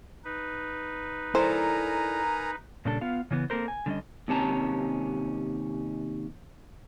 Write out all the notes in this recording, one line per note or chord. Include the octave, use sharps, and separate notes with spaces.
D#4 B4
E4 A4 A#4 C5 D5 G#5 A#5
A#2 C#3 G3 D4 A4
B3 F4 F5
C#3 E3 B3
A#3 C4 A4 A#4 C5
G#5
D3 G3 C#4 D#5
D#2 C3 C#4 A5 A#5